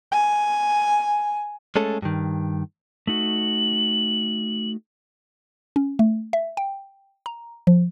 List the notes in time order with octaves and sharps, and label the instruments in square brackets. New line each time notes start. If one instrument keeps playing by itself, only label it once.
[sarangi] G#5
[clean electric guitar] G#3 A3 C#4 A4
G2 D#3
[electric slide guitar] A3 D#4 F#4 [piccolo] F#7
[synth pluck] C#4
A3
E5
G5
A#5
F3